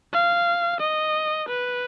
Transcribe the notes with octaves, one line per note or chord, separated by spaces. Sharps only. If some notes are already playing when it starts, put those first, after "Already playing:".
F5
D#5
B4